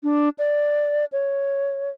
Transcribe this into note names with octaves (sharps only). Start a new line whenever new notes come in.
D4
D5
C#5